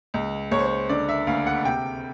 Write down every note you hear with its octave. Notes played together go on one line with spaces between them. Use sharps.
C#2
C#2 C#5
C5
C#5
D3 D5
E5
D2 F5
F#5
C3 G5